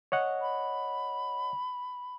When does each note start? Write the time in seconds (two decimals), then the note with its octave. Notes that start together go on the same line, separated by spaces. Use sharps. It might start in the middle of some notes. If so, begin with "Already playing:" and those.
0.12 C#5 D#5 F#5
0.41 B5